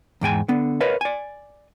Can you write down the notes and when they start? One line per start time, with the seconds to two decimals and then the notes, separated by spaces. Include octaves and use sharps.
0.21 E2 G#2 G5 G#5
0.48 D3 B3
0.81 A#4 B4 C#5 D#5 F5
1.01 D5 G#5